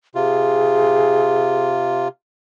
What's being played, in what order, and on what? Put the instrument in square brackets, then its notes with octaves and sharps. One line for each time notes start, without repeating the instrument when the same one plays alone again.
[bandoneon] C3 F4 [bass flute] G#4